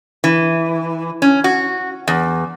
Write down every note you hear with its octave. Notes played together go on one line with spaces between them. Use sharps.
E3
C#4
F#4
E2